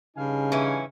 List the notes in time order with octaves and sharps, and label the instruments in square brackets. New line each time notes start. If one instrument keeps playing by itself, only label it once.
[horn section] G2 F5 G#5 [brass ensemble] C#3 D#4
[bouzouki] E3 C#4